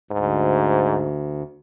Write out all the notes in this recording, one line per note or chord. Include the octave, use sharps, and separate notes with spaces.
D2 G#2